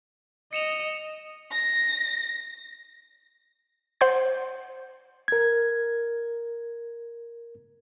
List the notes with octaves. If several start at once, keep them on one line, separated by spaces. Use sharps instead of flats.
D#5 C#7 E7 F7
A#6
C5 F#5 C6 G6
A#4 G#6